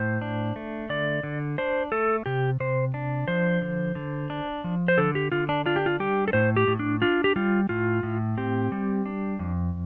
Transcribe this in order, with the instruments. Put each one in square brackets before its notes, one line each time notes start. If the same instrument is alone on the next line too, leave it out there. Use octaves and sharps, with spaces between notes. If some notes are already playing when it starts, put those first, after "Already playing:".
Already playing: [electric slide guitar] A2 C5
D4
A3
D3 D5
D3
D4 C5
A3 A4
C3 G4
C3 C5
D4
F3 C5
D3
D3
D4
F3
C5
D3 A4
G4
D3 F4
D4
D4 F4
G4
F4
G3 G4
A4
A2 C5
G4
A2
D4
D4 F4
G4
G3 F4
A2 F4
A2
C4 G4
G3
D4
F2